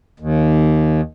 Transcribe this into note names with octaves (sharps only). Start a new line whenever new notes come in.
D#2